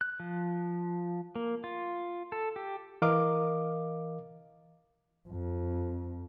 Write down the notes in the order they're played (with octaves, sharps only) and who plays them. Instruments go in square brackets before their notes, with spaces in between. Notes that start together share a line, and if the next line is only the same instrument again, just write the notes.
[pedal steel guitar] F#6
F3
A#3
F4
A4
G4
[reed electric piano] E3 A#4 D#5 F5 D6
[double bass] F2